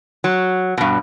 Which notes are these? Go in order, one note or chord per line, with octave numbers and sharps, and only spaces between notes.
F#3
G2 B2